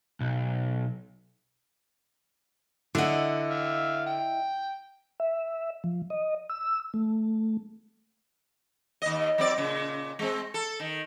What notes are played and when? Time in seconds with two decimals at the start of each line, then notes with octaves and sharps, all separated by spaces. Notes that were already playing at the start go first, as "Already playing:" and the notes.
0.20 B1
2.95 D3 E4 D#5 F#5
3.50 E5 F5
4.06 G5
5.20 E5
5.84 F3
6.10 D#5
6.49 E6
6.94 A3
9.02 D#2 D#5
9.38 F#3 C4 D5
9.58 A#2 C#3
10.19 G#3 C4
10.54 A4
10.80 D#3